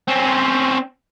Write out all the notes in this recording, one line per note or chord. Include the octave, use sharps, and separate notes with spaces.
C4 C#4